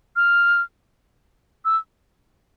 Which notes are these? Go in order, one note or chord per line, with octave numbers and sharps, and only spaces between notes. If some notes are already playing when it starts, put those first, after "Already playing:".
F6
E6